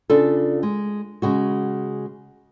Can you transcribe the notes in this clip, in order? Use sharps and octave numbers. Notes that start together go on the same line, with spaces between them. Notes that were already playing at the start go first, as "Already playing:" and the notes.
C#3 D4 F4 A4
G#3
C#3 G#3 F#4